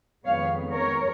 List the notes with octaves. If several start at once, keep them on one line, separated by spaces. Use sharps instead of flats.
F2 D#3 G#3 B3 C#5 F5
A#4 C#5